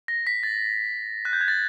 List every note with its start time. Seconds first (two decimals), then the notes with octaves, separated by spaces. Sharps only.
0.08 A#6
0.27 B6
0.43 A6
1.25 F#6
1.33 G6
1.41 G#6
1.48 A6